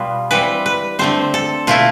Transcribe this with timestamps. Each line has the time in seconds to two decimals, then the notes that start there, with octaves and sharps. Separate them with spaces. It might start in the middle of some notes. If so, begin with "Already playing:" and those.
Already playing: B2 G3 B3 F4
0.31 E3 G3 C4 B4
0.66 B4
0.99 D3 A3 C4 C5
1.34 A4
1.67 B2 A3 E4 F4